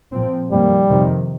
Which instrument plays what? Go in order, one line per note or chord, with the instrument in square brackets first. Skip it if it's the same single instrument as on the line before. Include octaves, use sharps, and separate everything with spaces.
[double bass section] A#2 F3 C4
[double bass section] F2 D#3 A#3 [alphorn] G3
[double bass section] F2 C3 D#3